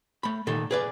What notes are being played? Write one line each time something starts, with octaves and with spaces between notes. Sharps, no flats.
A3 B5
A#2 D#3 A4
G#4 B4 D5